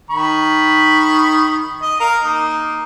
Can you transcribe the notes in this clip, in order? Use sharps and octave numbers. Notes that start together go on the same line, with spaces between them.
D#3 B5 C#6
D#5
A#4 F5
A#3 D#4